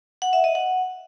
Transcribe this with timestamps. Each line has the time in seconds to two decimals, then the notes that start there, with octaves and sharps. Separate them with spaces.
0.22 F#5
0.33 E5
0.44 D#5
0.55 F#5